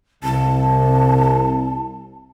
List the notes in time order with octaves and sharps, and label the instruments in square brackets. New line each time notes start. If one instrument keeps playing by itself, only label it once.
[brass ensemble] C2 [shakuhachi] A5